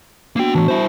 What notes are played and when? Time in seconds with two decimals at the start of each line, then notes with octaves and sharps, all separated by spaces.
0.36 A#3 B3 D4 F#4 G5
0.55 A2 E3 A5 C#6
0.68 E4 C5